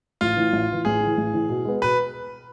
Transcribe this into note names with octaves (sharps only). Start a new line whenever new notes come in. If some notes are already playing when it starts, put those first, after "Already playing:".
A1 F4
A2 E3
A1
A2 E3
A1 G#4
A2 E3
A1
A2 E3
B2
G#3 B3
B2 B4